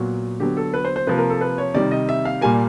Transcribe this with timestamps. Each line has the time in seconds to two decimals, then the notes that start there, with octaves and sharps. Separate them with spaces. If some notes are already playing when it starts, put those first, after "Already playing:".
Already playing: A#2 F#3 B3 F#4
0.40 D3 F#3 B3 G4
0.57 A4
0.74 B4
0.85 C5
0.96 C5
1.07 C3 F3 A#3 B4
1.18 A#4
1.30 A4
1.41 B4
1.58 C#5
1.74 C3 D#3 G3 D5
1.91 D#5
2.09 E5
2.25 F5
2.41 A#2 G3 A#3 G#5